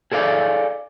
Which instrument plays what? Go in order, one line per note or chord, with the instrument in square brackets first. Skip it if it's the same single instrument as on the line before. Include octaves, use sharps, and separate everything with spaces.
[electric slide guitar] G#4 A4 D5 F5